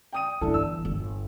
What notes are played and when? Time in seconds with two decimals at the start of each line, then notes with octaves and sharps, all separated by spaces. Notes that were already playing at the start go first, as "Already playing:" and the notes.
0.13 G5 D#6 D#7
0.41 G1 E3 D4 E4 A4
0.54 E6
0.85 G1